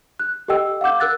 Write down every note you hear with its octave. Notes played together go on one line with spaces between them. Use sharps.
F#6
G4 A4 D#5 G5 E6
F5 F#5 D6 G6
A#4 E6 F#6 A6